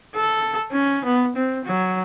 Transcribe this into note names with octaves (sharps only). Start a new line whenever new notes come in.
A4
C#4
B3
C4
F#3